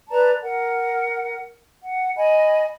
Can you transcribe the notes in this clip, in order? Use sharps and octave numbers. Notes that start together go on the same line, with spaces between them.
B4 D5 A5 A#5
A#4 F#5
F#5
D#5 G#5 B5